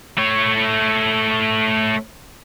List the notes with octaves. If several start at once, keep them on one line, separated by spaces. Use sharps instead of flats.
A3 C#5